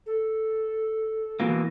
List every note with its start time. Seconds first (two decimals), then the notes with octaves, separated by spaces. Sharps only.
0.06 A4
1.40 B2 E3 A#3